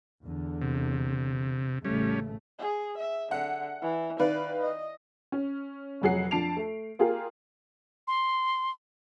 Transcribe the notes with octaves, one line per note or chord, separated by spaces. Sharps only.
E2 D3
C3
A1 C#3 G3 A3 C#4
G#4
E5
D3 F#5
E3
D#3 B4 D5 F5
D#5
C#4
F1 F2 F#3 G#4 F#5 C7
F2 D4 A5 C7 D7 F7
A3
A#3 F4 G4 G#4 A#4 F5
C6